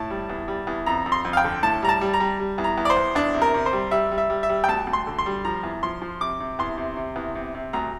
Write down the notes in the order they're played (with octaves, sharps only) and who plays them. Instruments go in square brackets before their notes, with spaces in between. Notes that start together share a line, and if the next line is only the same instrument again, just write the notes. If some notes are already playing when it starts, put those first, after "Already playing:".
Already playing: [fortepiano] A2 A5
G3
E2
G3
E2
F2 A#5
F2
C6
F2
F5
G5
D3
A2 A5
G3 A#5
A5
G3
A#5
G3
G3
E2
A#5
E2
D5
C5
E2
E2 D4
C3
A#4
C3
C5
G3
G3 E5
G3
E5
G3
E5
G3
G5
D2 A5
D2
C6
D3
C6
G3
F3 A#5
E2
F3 C6
F3
C3 D6
C3
E2 C6
C3
C3
E2
C3
C3
D2 A#5